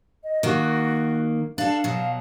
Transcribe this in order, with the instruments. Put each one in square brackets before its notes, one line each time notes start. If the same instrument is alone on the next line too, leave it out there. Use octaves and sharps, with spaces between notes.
[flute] D#5
[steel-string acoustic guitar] D#3 A#3 [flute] F#4
[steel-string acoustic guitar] D4 A4 [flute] F5
[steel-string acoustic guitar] B2 F#3